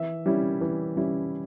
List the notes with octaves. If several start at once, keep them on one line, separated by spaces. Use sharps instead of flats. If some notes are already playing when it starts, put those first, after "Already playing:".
Already playing: E3 E5
G3 C#4 E4
E3
G3 C#4 E4